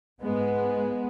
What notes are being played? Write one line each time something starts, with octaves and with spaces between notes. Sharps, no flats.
G#2 G#3 B3